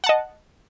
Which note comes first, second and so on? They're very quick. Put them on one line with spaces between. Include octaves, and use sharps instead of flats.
F#5 A5 D#5